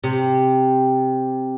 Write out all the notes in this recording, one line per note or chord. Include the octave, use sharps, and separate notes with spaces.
C3